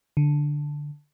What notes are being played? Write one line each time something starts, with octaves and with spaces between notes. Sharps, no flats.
D3